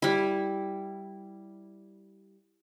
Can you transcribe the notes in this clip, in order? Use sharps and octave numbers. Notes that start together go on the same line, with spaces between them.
G3 E4